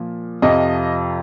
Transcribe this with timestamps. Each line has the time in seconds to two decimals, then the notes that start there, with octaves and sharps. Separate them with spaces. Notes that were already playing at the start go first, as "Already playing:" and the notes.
Already playing: A#2 F3
0.42 F2 C3 F3 D#5